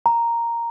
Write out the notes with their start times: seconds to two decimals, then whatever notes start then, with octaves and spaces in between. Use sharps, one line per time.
0.06 A#5